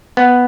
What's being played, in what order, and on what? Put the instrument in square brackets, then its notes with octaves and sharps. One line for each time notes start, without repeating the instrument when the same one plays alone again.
[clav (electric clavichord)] B3